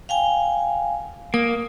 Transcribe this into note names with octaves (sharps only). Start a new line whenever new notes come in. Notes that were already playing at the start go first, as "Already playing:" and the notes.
F5 G5 G#5
A#3 D#6